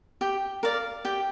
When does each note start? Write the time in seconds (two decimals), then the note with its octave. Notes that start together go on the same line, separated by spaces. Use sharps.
0.21 G4 G5
0.63 A#4 D5 F5
1.05 G4 G5